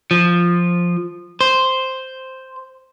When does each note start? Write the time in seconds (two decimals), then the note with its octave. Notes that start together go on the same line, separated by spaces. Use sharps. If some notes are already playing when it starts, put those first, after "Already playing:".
0.11 F3
1.41 C5